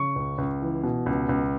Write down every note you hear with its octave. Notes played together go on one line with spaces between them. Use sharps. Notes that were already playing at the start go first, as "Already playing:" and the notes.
Already playing: C#3 C#6
C#2
C#2
E3
B2
C#2
C#2